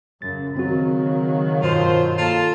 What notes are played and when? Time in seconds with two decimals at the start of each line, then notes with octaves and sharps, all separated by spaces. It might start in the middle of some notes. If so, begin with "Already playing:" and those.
0.22 F#2 C#3 A6
0.57 D#3 F#3 C4 F#4
1.63 G2 B2 F4 C5
2.19 A#3 F4 A4 A5